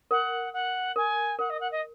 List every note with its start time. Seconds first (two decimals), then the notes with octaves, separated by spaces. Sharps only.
0.11 A#4 F#5
0.53 F#5
0.96 A#4 G#5
1.39 A#4 F#5
1.50 D#5
1.60 F#5
1.71 D#5